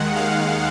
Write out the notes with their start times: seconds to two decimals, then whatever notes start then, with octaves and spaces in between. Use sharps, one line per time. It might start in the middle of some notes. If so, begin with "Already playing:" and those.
Already playing: D#2 D#3 G#3 F#5
0.16 F5